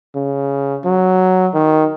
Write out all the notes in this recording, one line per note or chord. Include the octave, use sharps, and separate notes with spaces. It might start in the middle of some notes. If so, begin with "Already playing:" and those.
C#3
F#3
D#3